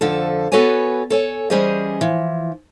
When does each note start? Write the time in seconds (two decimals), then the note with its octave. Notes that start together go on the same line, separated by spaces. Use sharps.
0.01 F2 D3 F3 A4
0.52 B3 F#4 A4 B4 C#5 G#5
1.10 A4 C#5 G#5
1.50 E3 G3 C#4 G#4 C5 D#5
2.01 E3 F3